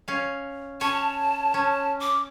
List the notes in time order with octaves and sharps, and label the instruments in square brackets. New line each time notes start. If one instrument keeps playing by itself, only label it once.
[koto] C#4 F5
[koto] C#4 C#5 [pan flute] A5
[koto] C#4
[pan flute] D6